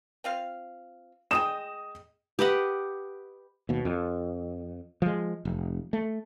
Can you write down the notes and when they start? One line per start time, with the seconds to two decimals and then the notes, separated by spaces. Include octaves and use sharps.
0.24 C4 F4 F5
1.31 G#3 D#5 G5 D#6 E7
2.39 G4 B4 D#5 F#5
3.69 D#2 B2
3.85 F2
5.02 F3 G#3
5.45 F1
5.93 A3